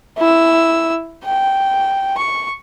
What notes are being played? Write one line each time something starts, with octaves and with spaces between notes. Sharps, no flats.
E4 E6
G5
C#6